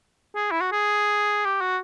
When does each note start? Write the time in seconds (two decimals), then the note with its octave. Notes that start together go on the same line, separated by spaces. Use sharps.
0.35 G#4
0.51 E4
0.61 F#4
0.72 G#4
1.45 G4
1.61 F#4